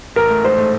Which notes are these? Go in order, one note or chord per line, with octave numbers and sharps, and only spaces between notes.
A1 A#4
A3
G#2 C5
A3